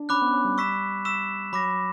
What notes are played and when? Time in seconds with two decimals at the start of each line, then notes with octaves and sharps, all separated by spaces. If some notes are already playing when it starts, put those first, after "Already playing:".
Already playing: D4
0.09 C#4 B5 D6 F#6
0.22 B3
0.34 C#4
0.45 G3
0.58 C#6 E6 B6 E7
1.05 C#6 E6 B6 E7
1.53 F#3 B5 D6 A#6